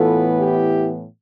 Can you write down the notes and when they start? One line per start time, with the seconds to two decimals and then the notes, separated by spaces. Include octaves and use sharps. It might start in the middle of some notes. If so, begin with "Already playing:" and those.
Already playing: A2 E3 B3 F4 A4
0.38 E4 G4